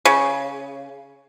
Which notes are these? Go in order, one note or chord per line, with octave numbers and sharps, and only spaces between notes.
C#3